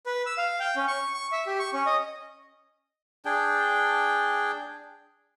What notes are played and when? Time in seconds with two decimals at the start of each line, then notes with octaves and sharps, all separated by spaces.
0.06 B4
0.26 E6
0.38 F5
0.60 G5
0.76 C#4
0.88 C#6
1.14 C#6
1.32 E5
1.47 G4
1.59 C#6
1.73 C#4
1.86 D#5
3.25 D4 G#4 G5